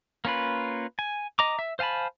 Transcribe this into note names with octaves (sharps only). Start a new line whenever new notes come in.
A#3 C#4 F4 B4
G#5
D#5 A#5 D6
E5
C5 F5 G#5 A5 B5